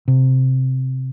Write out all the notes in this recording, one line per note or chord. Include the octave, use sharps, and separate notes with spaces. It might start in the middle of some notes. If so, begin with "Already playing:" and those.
C3